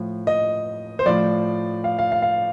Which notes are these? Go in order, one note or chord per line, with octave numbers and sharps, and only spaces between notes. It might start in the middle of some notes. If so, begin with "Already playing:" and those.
Already playing: A2 F3
D#5
C5
A2 F3 D5
F5
F5
F5
F5